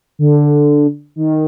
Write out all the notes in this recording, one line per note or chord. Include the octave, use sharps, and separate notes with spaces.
D3
D#3